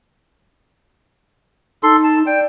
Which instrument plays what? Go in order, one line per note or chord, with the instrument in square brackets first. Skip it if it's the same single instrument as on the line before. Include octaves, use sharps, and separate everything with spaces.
[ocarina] D#4 [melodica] A4 C6
[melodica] A5
[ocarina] D5 [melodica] G5